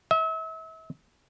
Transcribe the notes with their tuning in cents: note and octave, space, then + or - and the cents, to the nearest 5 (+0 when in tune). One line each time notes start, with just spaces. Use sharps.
E5 -35